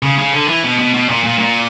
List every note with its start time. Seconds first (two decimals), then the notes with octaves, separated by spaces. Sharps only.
0.03 C#3
0.18 C#3
0.33 D3
0.48 E3
0.64 B2
0.79 B2
0.94 B2
1.09 A#2
1.24 A#2
1.39 A#2